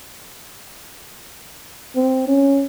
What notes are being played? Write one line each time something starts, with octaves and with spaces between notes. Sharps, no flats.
C4
C#4